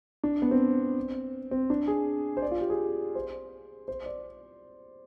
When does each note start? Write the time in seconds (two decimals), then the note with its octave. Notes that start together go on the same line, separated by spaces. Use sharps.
0.24 D4
0.42 B3
0.51 C4
1.51 C4
1.70 D4
1.88 G#4
2.37 C5
2.42 D5
2.51 F4
2.61 G4
2.70 G#4
3.15 C5
3.88 C5
4.06 D5